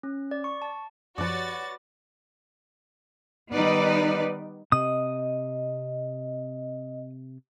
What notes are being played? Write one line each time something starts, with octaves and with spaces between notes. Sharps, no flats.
C#4
D5
C#6
A5
F#2 F3 F#4 B4 C#5 D5 A6
D#3 G3 B3 D#4 B4 D5
C3 D#5 D#6